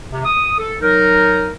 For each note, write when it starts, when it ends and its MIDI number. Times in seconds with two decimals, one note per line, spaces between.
0.11 0.24 48
0.24 0.57 87
0.59 0.76 69
0.81 1.50 54
0.81 1.50 63
0.81 1.50 70